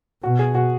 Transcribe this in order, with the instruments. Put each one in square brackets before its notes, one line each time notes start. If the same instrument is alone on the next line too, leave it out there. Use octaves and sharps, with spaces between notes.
[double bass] B2 [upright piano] F#4
[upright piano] G#4
F#4